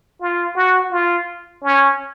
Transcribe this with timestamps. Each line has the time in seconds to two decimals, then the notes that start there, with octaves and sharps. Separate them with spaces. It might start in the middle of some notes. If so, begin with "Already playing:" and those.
0.21 F4
0.56 F#4
0.91 F4
1.63 C#4